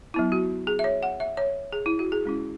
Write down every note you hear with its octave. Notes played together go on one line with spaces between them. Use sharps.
F#3 B3 E4
F#4
G#4
E5
C#5
F#5
E5
C#5
G#4
E4
F#4
G#4
G#3 C#4 E4